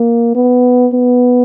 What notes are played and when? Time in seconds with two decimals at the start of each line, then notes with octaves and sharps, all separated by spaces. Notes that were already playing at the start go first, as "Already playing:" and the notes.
Already playing: A#3
0.35 B3
0.93 B3